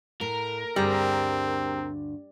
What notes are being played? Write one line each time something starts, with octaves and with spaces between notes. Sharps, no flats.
A2 A#4
D2 G2 G3 C4 G#4